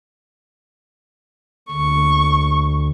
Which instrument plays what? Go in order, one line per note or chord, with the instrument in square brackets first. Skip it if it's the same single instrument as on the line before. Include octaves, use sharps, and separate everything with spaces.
[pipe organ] D2 [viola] C#6